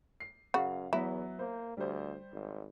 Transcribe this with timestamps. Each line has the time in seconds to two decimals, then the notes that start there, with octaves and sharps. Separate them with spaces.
0.20 C7
0.54 F#2 C#3 F#4 F5
0.93 E2 F#3 B3 E4
1.39 A#3 C5
1.77 D2 G3 C5
2.33 G#1